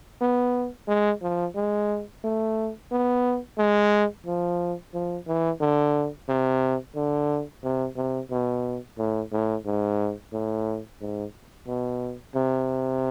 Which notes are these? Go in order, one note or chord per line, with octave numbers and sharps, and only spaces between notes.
B3
G#3
F3
G#3
A3
B3
G#3
F3
F3
E3
D3
C3
D3
C3
C3
B2
A2
A2
G#2
A2
G#2
B2
C3